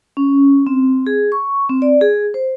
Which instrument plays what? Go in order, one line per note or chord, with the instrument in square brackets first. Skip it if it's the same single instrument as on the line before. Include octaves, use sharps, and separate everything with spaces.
[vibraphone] C#4
C4
G#4
C#6
C4
D5
G#4
C5